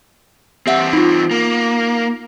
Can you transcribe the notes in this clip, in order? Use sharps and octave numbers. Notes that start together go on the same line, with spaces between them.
E3 C4 G4 E5 F#5
D#4 F4
A#3